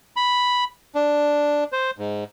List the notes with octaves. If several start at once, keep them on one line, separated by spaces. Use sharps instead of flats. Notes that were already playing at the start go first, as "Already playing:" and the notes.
B5
D4
C5
G#2